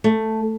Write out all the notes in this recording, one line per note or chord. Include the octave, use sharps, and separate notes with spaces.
A3